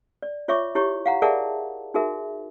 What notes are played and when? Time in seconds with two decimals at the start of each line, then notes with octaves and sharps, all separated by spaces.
0.22 D5
0.48 F4 C#5 E5 C#6 D6
0.75 E4 G4 C#5 C#6
1.06 F5 F#5 A#5
1.22 G#4 A#4 D5 E5 F#5 A5
1.94 D#4 F#4 G#4 A#4 E5